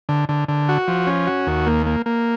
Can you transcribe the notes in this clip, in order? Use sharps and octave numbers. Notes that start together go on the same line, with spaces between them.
D3
D3
D3
F#4
F3
C#4
F#4
D#2
A#3
A#3
A#3